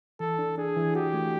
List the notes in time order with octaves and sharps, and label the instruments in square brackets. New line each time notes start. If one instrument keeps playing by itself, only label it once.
[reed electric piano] E3 [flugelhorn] A4
[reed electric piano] D4
[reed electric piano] D4 [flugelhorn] G#4
[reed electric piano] E3
[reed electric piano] F#4 [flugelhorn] G4
[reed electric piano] A3